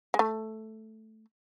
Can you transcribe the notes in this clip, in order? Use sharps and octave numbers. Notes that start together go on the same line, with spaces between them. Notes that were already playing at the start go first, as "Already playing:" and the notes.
G#3
A3